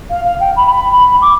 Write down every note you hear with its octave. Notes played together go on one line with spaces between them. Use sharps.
F5
F5
G5
B5
B5
D6